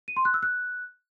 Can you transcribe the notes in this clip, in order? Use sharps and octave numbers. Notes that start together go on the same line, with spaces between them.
D#7
C6
F#6
E6
F#6